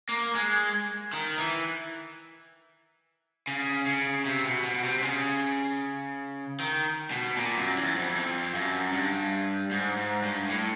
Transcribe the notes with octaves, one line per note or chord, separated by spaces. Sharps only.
A#3
G#3
D#3
E3
C#3
C#3
C3
B2
B2
B2
C3
C#3
D#3
B2
A#2
F#2
E2
F2
F2
F#2
G2
G#2
G#2
G2
A2